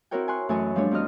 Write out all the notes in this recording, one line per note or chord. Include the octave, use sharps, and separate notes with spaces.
C4 E4 F#4 A#4 C#5 G5
G#5 C6 C#6 F#6
F#2 E3 A3 C#5 D#5 G#5
F3 G3 A3 D4 C#5
E2 C4 F#4 C5 D#5 F6